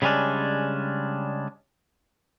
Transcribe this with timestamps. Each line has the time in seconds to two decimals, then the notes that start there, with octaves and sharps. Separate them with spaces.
0.02 C#3 G3 G#3 C#4 D4